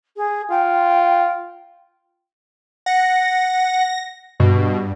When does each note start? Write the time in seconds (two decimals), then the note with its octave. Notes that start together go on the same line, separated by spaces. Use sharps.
0.16 G#4
0.51 F4 G5
2.86 F#5 A#6
4.40 G2 B2